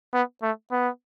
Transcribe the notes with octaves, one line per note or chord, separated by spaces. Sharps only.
B3
A3
B3